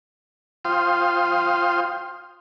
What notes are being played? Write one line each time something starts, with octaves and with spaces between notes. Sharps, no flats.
F4 C5 F5 G5 C6 D#6